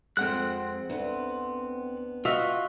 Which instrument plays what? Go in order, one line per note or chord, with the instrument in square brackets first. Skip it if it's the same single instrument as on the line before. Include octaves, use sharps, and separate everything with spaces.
[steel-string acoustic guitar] F2 G#3 [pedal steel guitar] C4 F#5 F#6
[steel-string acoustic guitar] D2 B3
[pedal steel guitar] F4 [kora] F#4 D#5 E5